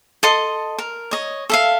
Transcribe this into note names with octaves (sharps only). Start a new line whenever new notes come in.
A4 D#5 C6
A#4
C#5 D#5
A4 E5 F5